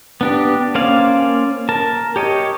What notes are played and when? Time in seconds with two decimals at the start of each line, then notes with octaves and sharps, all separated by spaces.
0.21 B3 D4 G4
0.75 A#3 C#4 C5 D5 F5
1.69 A#4 A5
2.16 G4 C#5 D#5